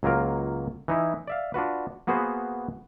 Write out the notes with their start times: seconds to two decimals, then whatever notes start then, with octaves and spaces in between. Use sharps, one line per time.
0.03 C#2 F#3 A#3 F4 A#4
0.88 E3 D#4 E4
1.27 D5 E5 F5
1.54 D4 F4 F#4 B4
2.07 A#3 B3 F#4 G#4 B4 C5